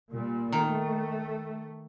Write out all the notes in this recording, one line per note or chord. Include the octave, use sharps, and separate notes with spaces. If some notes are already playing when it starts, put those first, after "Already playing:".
A#2 G3
D#3 A3